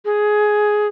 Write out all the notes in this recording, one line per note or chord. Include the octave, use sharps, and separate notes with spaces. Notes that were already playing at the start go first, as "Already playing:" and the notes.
G#4